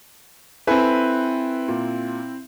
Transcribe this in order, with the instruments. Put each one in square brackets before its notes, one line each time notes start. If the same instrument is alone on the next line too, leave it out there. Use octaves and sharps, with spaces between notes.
[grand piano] C4 E4 [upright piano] A4 B4 G#5
[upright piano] A#2